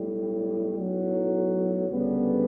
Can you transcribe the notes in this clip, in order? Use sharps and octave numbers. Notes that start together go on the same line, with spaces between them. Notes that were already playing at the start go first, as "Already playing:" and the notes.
Already playing: B1 A2 G3
B1 A2 F#3
D2 C#3 G3 B3 D4